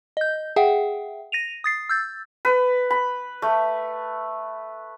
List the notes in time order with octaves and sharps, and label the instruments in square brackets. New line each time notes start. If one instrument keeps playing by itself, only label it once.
[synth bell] D#5 G6
G#4 E5 F#5 G5
A#6 D#7 F7
D#6 A6 C7
E6 G6 A6
[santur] B4
B5
A3